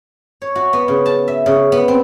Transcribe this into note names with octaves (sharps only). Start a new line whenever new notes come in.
C#5
F#4
B3
C#3
A5
E5
C#3
B3
C4